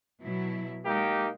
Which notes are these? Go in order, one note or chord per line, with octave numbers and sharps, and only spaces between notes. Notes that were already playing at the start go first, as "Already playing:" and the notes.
B2 F#3 E4
G#3 A#3 D#4 G4